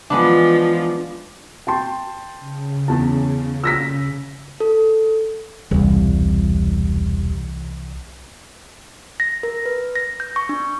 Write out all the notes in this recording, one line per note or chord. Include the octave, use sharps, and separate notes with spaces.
E3 F3 G#3 B3 D4
G5 A5 C6
C#3
E2 A5
E6 A#6 B6
A4
E1 C2 E3 G3
A#6
A#4
B4
A#6
G6
C#6
D4